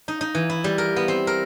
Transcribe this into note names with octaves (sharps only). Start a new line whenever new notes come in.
D#4
D#4
E3
E4
G3
A#4
B3
C4
A#4